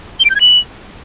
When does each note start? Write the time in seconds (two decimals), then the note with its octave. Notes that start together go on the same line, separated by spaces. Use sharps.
0.20 G7
0.25 D7
0.30 G6
0.35 G#6
0.41 F#7